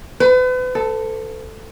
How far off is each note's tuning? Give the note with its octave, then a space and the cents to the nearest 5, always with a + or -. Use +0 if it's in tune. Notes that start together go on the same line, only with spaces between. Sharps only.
B4 +40
A4 +10